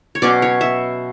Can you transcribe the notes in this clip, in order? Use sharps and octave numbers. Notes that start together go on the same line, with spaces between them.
C#5
B2 F#3 C#4 D5
C#5
E5